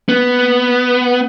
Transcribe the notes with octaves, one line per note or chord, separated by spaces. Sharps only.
B3